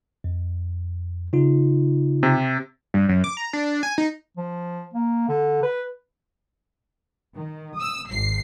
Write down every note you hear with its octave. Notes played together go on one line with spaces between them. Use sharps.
F2
C#3 D#4 F4
C3
G2
F#2
D6
A#5
D4
G#5
D#4
F3
A#3
D3
B4
D#3
D#6 E6
G#1 C7